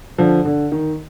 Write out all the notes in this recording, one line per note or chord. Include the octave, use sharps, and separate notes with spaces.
D3 F3
D3
D#3